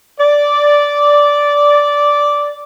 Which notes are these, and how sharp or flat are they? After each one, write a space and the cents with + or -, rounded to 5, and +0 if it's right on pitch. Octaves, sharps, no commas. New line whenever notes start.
D5 -10